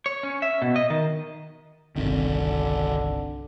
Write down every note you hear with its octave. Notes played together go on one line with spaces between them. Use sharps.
C#5
C#4
E5
B2
D#5
D#3
G1 C2 D3 D#3 C4